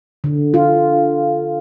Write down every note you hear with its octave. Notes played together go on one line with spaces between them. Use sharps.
D3
F4